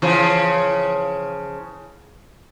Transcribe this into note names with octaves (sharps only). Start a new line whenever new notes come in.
C#3 E3 F3